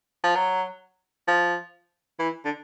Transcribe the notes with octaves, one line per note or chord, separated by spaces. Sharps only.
F3
F#3
F3
E3
D3